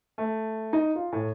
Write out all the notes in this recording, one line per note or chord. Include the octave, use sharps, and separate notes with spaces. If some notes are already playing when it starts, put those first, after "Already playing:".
A3
D#4
F4
A2